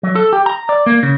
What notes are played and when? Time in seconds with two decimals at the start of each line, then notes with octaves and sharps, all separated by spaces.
0.03 F#3
0.15 A4
0.33 G4
0.46 A#5
0.69 D5
0.86 A#3
1.03 C#3